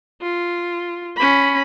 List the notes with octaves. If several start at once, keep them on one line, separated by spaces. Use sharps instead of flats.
F4
C#4 B5